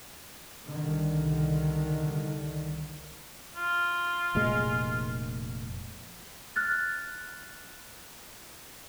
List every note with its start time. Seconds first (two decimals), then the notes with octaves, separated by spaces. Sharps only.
0.64 C2 D3 D#3
3.56 F4
4.35 F1 A#2 G#3
6.56 F6 F#6 A6